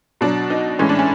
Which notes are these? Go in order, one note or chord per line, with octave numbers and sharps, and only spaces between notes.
B2 F#3 D4
D#4
A2 E3 G#3 C#4
D4
C#4